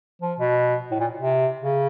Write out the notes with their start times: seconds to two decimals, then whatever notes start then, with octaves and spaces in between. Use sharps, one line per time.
0.22 F3
0.39 B2
0.91 A2
1.00 A#2
1.18 C3
1.61 C#3